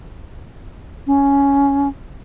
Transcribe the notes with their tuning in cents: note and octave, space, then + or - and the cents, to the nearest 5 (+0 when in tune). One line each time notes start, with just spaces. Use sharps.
C#4 +5